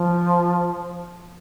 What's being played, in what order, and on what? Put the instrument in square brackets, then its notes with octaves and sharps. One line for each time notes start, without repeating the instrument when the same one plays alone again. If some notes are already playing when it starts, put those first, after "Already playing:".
Already playing: [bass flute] F3